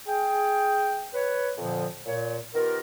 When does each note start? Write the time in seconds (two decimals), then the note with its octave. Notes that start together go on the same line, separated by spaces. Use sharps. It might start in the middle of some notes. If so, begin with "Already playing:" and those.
0.07 G#4 G5
1.13 B4 C#5
1.58 F2 A#2 D3 F3
2.06 A#2 C#5
2.54 D#3 B3 F4 G4 A#4